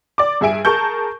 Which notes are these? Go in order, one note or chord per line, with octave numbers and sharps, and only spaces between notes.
D5 D6
G2 G#4 E5 G#5 D7
G#4 A#4 A5 C#6 G6